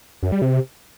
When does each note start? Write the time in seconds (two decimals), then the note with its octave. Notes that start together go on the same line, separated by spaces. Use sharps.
0.23 F#2
0.32 G3
0.42 C3